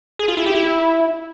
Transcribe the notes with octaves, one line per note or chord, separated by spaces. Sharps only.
G#4
F4
E4
G4
E4